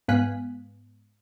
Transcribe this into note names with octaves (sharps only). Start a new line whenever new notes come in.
G#2 B3 F5 G#5 F#6 B6